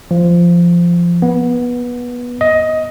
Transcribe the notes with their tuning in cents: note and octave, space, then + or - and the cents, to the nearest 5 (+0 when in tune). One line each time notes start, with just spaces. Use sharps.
F3 -15
B3 -15
D#5 +15